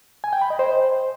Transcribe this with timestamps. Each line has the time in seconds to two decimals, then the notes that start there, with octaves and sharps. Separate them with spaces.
0.24 G#5
0.33 G5
0.41 B5
0.50 D#5
0.59 C5